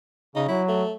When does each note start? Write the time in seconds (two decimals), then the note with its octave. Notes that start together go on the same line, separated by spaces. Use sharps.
0.35 C#3 D#4
0.48 F#3 E4
0.68 A3